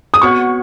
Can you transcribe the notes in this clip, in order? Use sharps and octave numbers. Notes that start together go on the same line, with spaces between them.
D#6
B3 F#4 C#5 F#5 C#6